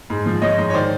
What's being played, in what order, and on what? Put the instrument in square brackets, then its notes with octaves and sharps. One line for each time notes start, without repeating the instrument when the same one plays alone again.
[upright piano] G#2
F3
F3 C#5 D#5
G#2
C#5
D#3 C5 D5